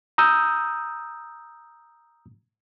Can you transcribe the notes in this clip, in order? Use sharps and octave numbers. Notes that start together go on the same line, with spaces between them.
A#5 D#6 E6 G6